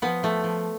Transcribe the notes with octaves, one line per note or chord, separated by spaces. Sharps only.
F3 B3
F3 A3
F3